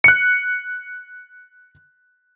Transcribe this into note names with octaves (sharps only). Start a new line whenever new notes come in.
F#6 C#7